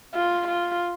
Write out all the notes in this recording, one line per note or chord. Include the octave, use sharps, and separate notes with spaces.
F4
F4